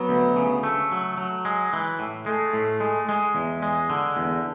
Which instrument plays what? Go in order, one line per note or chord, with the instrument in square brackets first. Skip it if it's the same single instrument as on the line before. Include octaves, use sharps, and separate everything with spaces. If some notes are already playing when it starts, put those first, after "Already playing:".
Already playing: [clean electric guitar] F#3 [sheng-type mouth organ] B3
[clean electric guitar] D2
C#3
A3
F#3
F#3
G#3
E3
A2
[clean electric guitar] G#3 [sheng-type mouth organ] A3
[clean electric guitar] A2
G#3
G#3
E2
G#3
D3
E2